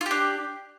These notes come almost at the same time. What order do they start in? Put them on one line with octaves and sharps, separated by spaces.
F4 G4 D4